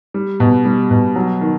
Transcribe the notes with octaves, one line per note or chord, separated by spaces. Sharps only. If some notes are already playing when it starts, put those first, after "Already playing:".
G3
B2
G3
B2
F#3
D#3